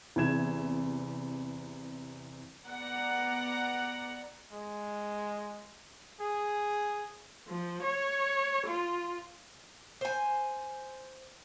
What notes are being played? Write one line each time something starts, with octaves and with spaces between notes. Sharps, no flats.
E2 C3 G#6 E7
B3 D5 F#5 A#5
G#3
G#4
F3
C#5
F4
C5 G#5